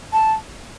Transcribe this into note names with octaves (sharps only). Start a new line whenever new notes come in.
A5